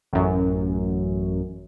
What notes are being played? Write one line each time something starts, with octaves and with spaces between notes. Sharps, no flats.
A1 F#2